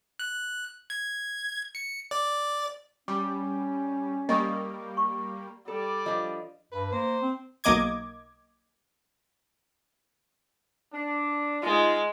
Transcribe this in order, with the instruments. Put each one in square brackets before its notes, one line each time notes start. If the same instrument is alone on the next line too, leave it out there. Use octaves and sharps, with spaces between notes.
[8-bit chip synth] F#6
G#6
C#7
D5
[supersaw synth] G3 [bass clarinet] C#4 [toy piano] D6
[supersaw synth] G3 A#3 [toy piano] D#5 C#6 D#6
[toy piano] C#6
[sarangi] G3 [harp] A4 [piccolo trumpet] D5
[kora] F3 D4 [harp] D#5
[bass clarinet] G2 [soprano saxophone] B4
[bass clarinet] A#3 [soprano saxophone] C5
[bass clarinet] C4
[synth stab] B1 A#3 D#5 D6 G#6
[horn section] D4
[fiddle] G#3 [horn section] D#4 F4